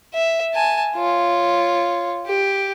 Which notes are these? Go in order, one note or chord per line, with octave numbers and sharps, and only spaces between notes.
E5
G#5 A5
F4 C#5
G4